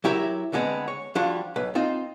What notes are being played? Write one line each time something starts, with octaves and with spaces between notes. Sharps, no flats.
F#3 E4 G4 A#4 E5
D2 D3 G3 G#3 B3 C4
C#5
F3 G3 D4 F4 F#4 F5
B1 B4
C4 D#4 F4